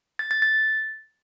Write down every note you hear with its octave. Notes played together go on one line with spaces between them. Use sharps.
A6
A6
A6